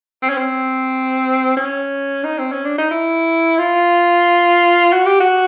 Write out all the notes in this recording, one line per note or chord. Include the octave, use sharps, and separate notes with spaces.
C4
C#4
C4
C#4
D#4
C4
C#4
D4
D#4
E4
F4
F#4
G4
F#4